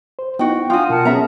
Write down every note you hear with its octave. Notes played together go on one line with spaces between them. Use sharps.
C5
B3 D#4 E4 F#4 G5
D4 F4 F#4 F5 G5 G#5 D#6
B2 A#4 F#5 A5
B3 C#4 G#4 E5 A#5